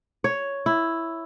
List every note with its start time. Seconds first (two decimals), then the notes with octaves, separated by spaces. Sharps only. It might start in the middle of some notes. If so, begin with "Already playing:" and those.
0.24 C#5
0.66 E4